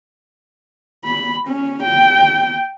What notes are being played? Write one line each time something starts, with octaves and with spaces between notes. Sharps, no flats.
B5
C#4
G5